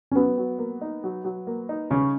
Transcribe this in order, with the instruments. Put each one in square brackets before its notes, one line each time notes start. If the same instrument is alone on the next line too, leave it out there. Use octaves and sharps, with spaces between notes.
[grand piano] C#4
[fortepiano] F#3 [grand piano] B3
[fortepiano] F#3
A#3
D#4
F#3
F#3
A#3
D#4
[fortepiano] C#3 [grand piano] C#4